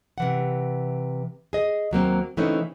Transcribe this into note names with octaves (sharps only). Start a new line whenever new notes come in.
C3 E3 F#5
G#4 D#5
D#2 F#3 A#3 C4
C#3 E3 A3 C4 C#4 D#4